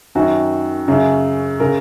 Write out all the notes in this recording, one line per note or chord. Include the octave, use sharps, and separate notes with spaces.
F#2 D#3 F#4
F#2 C#3
C#3 A#4